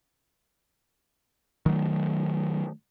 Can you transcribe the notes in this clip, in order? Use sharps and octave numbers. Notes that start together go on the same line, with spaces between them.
D#3 F#3 A3